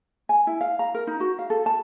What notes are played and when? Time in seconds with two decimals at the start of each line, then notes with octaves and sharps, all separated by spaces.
0.29 G#5
0.47 E4
0.61 F5
0.79 A#5
0.95 A#4
1.07 D#4
1.20 F#4
1.39 F5
1.50 A4
1.66 A5